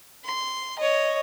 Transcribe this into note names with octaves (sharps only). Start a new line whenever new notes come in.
C6
C#5 D#5